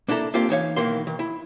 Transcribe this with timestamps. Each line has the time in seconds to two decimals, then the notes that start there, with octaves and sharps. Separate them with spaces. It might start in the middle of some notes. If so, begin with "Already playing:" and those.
0.08 A#3 D4 E4 A4 A#5
0.34 A#3 C4 D4 F4 G4
0.49 E3 D#4 C#5 F5
0.76 B1 D#3 E3 A#3 C6
1.07 D#3
1.19 E4